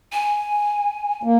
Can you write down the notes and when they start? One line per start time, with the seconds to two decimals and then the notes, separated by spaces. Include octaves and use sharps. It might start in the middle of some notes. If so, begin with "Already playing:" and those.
0.12 G#5
1.23 A#3